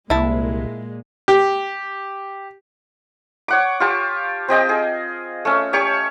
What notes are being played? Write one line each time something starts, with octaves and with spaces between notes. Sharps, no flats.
C2 A#2 G#3 E4 A5
G4
C#5 F#5 D6
F4 G4 A5
C4 G4 D#5 G5
G#4
A3 C#4
G4 C#5 C#6